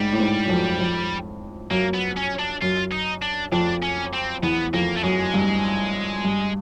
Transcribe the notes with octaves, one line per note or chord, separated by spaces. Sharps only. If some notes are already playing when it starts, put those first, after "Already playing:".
Already playing: G#2 G3
A2
G#2
F#2
F2
F2
F#2 A#3
B3
C#4
D4
F#2 F4
D#4
D4
F2 D4
C#4
C4
E2 B3
F2 A#3
A3
F#2 G#3
G2
G2